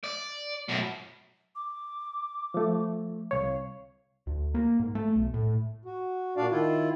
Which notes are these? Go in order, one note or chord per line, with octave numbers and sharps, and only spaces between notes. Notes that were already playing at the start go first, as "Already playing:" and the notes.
D5
F#2 B2
D6
F3 A3
C2 C#5 F5
D2
A#3
G#2
A3
B1
A2
F#4
A#2 D4 F#4 D5 F5
D#3 E4 F4